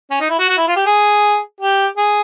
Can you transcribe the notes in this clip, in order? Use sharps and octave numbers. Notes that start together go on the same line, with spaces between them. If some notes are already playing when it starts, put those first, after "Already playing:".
C#4
D#4
E4
F#4
F#4
E4
F4
G4
G#4
G4
G#4